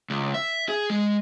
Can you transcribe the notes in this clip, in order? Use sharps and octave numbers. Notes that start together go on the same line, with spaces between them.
C#2
E5
G#4
G#3